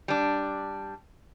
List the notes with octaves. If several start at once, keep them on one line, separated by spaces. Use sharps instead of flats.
G3 D4